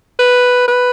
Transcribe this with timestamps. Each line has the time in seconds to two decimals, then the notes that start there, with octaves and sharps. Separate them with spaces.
0.19 B4
0.68 B4